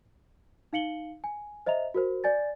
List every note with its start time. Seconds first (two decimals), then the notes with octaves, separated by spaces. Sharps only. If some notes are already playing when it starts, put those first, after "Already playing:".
0.73 D#4 F5 C#7 F#7 G7
1.24 G#5
1.66 C5 D#5 E5 A#5 F7
1.94 F#4 A#4 C5
2.24 D5 G#5 A6